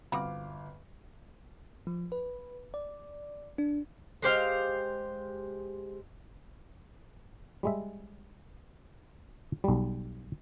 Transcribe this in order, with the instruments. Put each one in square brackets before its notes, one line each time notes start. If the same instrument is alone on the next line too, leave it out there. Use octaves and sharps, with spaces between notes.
[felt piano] G1 F5 D6 [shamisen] C4 F#4 B5
[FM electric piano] F3
B4
D5
D4
[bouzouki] G#3 G4 C5 F5
[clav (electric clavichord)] G3 G#3 E5
B1 G3